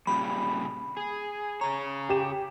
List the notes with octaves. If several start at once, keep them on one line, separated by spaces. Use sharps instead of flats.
A#2 C#3 G3 B5
G#4
C#3 G#4 C#5 A#5
G4 E7